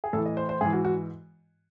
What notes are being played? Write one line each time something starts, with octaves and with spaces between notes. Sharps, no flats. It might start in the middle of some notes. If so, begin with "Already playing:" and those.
G#4
A2 E3 A4
D#5
C5
C5
G#2 E3 G#4
F#4
F#4